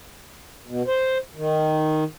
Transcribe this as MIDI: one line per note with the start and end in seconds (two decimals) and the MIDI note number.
0.66 0.82 47
0.87 1.18 72
1.35 2.04 51